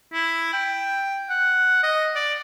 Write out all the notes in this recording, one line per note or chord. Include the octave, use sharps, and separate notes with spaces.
E4
G5
F#5
D#5
D5